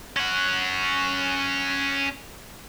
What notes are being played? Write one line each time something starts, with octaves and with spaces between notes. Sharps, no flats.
C#4 F#5